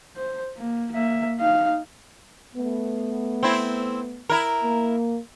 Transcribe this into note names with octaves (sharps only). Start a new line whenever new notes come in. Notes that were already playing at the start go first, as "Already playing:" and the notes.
C5
A#3
A#3 E5
D#4 F5
A3 B3
C4 E4
E4 A#4
A#3